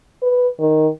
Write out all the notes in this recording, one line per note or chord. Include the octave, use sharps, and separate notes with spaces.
B4
D#3